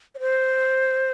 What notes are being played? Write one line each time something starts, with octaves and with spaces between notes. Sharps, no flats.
C#5
C5